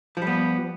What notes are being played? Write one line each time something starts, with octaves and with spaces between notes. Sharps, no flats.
F3 G3 B3